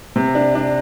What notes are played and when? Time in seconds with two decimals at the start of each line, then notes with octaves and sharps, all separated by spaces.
0.16 C3
0.35 D4
0.55 D4